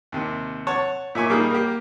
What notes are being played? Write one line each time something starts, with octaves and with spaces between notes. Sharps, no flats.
D#2 C3
C#5 F#5 A5 C#6
A#2 E5 G#5 C#6
G3 A#3 D#4 G#4
A#3 G4